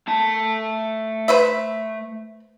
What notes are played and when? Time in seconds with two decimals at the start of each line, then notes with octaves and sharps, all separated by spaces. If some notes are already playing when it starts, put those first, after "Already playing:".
0.08 A3 A5
1.28 B4 C5 E5